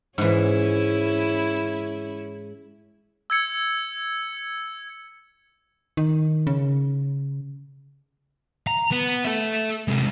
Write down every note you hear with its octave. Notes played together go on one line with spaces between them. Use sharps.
G#2 E3 C#4 E4
E6 G#6 C#7
D#3
C#3
A#5
B3
A4 E5
C3 G#3